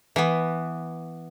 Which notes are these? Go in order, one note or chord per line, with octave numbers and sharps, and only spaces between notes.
E3 B3